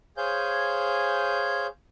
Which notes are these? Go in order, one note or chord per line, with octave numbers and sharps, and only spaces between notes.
G#4 C5 C#5 F5 G#5 G6